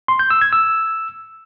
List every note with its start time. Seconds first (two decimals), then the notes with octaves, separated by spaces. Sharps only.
0.08 C6
0.19 G6
0.30 E6
0.41 G#6
0.53 E6